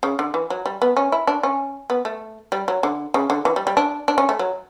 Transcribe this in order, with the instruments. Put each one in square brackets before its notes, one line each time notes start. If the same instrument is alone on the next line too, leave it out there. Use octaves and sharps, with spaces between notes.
[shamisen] C#3
D3
E3
F#3
G3
B3
C#4
E4
D4
C#4
B3
A3
G3
F#3
D3
C#3
D3
E3
G3
G3
D4
D4
C#4
A3
F#3